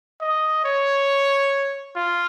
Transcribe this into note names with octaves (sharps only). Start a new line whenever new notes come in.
D#5
C#5
F4